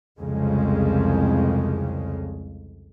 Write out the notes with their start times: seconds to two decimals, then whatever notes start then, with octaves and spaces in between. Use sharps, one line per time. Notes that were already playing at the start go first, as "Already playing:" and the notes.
0.18 C2 F2 C#3 G#3